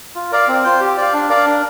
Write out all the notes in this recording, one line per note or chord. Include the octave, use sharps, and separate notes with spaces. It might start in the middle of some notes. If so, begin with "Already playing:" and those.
F4
A#4 D5 F5
C4
F4 C5 G5
G4
D5 F5
D4
A#4 D5 F5
D4